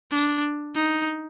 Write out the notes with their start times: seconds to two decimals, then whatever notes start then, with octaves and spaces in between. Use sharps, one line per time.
0.11 D4
0.75 D#4